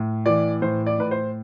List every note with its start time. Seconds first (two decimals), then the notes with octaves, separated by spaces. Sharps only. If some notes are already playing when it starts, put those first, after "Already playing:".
Already playing: A2
0.26 E3 D5
0.62 A2 C5
0.86 D5
0.98 A2 B4
1.11 C5